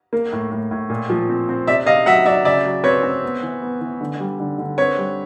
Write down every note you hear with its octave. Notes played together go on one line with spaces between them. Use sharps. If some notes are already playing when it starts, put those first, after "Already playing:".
A#3
A2
A2
A2
A#2
F3
C4
C4
C3 D5 E5
C3 D#5 F5
F#3 E5 F#5
F#3 D5 E5
C#3 D5 E5
F#3
C4 B4 C#5
C4
B3
E3
B3
E3
D3
G3
D3
D3
C4 B4 C#5
G3